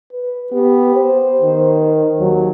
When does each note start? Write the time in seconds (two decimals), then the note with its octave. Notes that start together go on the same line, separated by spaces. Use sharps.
0.13 B4
0.52 B3 G4
0.96 C5
1.41 D#3
2.20 D#2 F#3